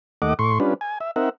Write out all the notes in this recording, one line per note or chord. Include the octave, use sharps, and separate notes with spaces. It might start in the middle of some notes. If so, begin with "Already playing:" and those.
D#2 A3 D#5 F#5 D6
A2 C6 C#6
G3 C#4 D4 F4 B4
G#5
E5
C4 D#4 A#4 E5 F#5